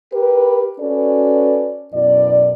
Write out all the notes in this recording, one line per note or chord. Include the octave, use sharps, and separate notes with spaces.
G4 A#4 B4
C#4 F#4 A4 B4 D5
F#2 B2 E4 D5